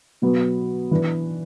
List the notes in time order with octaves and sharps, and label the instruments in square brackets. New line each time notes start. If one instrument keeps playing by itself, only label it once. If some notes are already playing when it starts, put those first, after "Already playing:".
[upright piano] B2 F#3 B3
E3 D4 B4